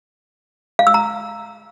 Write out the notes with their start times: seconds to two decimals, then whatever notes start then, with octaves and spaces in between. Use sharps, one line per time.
0.79 F5
0.87 E6
0.94 A#5